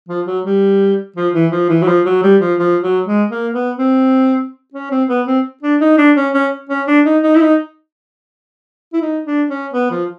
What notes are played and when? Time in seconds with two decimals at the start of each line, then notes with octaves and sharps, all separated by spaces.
0.09 F3
0.27 F#3
0.45 G3
1.16 F3
1.34 E3
1.52 F3
1.70 E3
1.82 F#3
1.88 F3
2.06 F#3
2.23 G3
2.41 F3
2.59 F3
2.83 F#3
3.07 G#3
3.31 A#3
3.54 B3
3.78 C4
4.74 C#4
4.91 C4
5.09 B3
5.27 C4
5.63 D4
5.81 D#4
5.98 D4
6.16 C#4
6.34 C#4
6.69 C#4
6.87 D4
7.05 D#4
7.23 D#4
7.35 E4
7.41 D#4
8.93 E4
9.02 D#4
9.26 D4
9.50 C#4
9.73 B3
9.91 F3